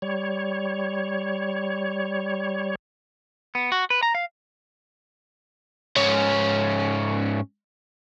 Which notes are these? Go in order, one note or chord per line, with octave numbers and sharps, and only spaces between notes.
G3 C#5
B3
F#4
B4
A#5
F5
G#2 C#4